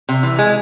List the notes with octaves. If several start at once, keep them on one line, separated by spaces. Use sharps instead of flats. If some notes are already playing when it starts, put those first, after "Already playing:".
C3
E3
G#3